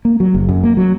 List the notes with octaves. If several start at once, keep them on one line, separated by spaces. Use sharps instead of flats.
A#3
F#3
F#1
F#2
A#3
F#3